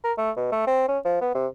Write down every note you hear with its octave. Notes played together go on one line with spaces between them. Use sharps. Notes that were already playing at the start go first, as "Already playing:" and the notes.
A#4
A3
B2
A3
C4
C#4
F3
B3
C3